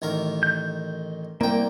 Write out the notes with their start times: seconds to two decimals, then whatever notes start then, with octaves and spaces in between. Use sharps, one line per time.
0.02 A1 D#3 A#4
0.43 G6
1.41 C2 A#3 G5